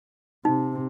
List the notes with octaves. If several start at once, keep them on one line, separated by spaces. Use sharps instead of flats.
C3 D#4